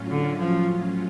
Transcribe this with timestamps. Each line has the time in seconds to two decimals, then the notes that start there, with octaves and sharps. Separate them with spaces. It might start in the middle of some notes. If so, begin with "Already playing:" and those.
Already playing: A2 F#3 C#4 F4
0.09 D3
0.38 F3